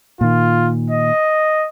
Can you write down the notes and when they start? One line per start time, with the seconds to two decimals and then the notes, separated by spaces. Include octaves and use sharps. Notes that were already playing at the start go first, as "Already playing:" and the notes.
0.21 A#2 D#3 F4
0.90 D#5